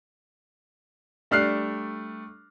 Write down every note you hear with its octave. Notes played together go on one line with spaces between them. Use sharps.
G3 A3 D4 F6 F#6 C7